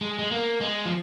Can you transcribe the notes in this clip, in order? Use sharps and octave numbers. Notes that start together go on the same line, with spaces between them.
G#3
G#3
A#3
G#3
F3